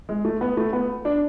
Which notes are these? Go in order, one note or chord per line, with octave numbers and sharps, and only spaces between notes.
G#3
A3
B3
A3
B3
D4